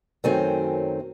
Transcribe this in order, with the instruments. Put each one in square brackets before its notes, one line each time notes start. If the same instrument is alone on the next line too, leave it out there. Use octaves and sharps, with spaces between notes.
[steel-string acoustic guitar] F#2 D#3 F#3 A3 C4 G#5